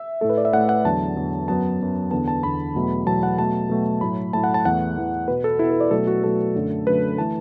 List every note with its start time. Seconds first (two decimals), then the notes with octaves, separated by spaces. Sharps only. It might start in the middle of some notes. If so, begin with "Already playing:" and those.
Already playing: E5
0.21 A2 A3 A4
0.29 B4
0.38 D5
0.45 E5
0.53 A2 A3 F#5
0.69 F#5
0.85 E2 D3 F#3 A5
1.17 E2 D3 F#3
1.48 F#2 F#3 B3 A5
1.80 F#2 F#3 B3
2.11 E2 D3 B3 A5
2.28 A5
2.43 E2 D3 B3 B5
2.75 E2 B2 F#3 A3
3.06 E2 B2 F#3 A3 A5
3.23 F#5
3.38 B2 F#3 A3 A5
3.69 B2 F#3 A3
4.01 A2 F#3 A3 B5
4.33 A2 F#3 A3 A5
4.44 F#5
4.54 A5
4.65 E2 E3 A3 F#5
4.97 E2 E3 A3
5.28 B2 B3 B4
5.44 A4
5.59 B2 B3 E4
5.71 A4
5.81 D5
5.91 B2 F#3 A3 A4
6.07 F#4
6.23 B2 F#3 A3 A4
6.55 F#2 D3 A3
6.87 F#2 D3 A3 B4
7.18 E3 A3 A5